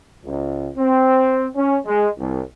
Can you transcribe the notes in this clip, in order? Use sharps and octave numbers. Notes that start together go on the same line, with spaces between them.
C#2
C4
C#4
G#3
C2